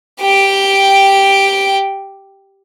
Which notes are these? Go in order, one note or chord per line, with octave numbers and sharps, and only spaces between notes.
G4 G5